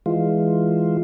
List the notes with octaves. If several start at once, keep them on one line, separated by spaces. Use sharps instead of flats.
E3 G#3 F4